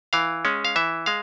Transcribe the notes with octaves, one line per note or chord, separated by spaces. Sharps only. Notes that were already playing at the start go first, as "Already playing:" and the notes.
E3 F5
G#3 C#4
F5
E3 E5
G#3 F5